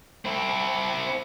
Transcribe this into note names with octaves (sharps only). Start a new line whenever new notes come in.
C4 E4